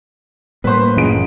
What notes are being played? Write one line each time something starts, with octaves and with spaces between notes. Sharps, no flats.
A2 G3 A#3 B4 C5
F#1 A2 G#4 D7